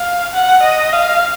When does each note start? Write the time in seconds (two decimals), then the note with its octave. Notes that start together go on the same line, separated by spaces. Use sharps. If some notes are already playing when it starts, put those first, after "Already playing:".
Already playing: F5
0.33 F#5
0.63 D#5
0.93 F5